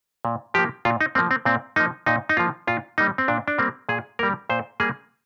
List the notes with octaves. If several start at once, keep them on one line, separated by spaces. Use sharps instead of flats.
A#2
F3 A#3 G4
A#2 F4
D#4
F3 A#3 C4
C4
A#2 C4
F3 A#3 D#4
A#2 D#4
D#4
F3 A#3 F4
A#2 F4
G3 A#3 D#4
C4
A#2 D4
D4
G3 A#3 C4
A#2 G#4
G3 A#3 A#4
A#2 C5
G3 A#3 G#4